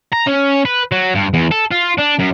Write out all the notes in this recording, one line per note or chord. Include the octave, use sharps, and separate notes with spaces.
A#5
C#4
B4
F#3
G2
E2
A4
F4
D4
F#2